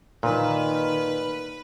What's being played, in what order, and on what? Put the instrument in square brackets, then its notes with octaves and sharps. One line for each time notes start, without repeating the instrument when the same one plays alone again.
[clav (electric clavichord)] A#2 [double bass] D#3 [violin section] B4